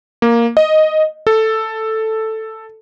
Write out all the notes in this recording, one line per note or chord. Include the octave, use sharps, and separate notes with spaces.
A#3
D#5
A4